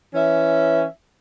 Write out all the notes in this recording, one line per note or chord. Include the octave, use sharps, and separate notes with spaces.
E3 C#4 E5